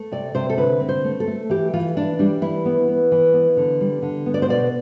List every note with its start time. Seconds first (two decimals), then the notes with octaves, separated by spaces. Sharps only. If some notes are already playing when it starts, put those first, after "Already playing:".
Already playing: A3
0.12 C3 D5
0.35 C3 C5
0.50 A4
0.58 D3 B4
0.81 C4
0.89 C5
1.04 A3
1.20 A4
1.27 A3
1.50 E3 G4
1.73 E3 F4
1.97 E3 D4
2.19 G3 D4
2.42 E3 E4
2.65 B3
2.88 B3
3.12 E3
3.33 B3
3.57 D3
3.81 G3
4.02 D3
4.26 B3
4.34 D5
4.42 C5
4.49 B2 D5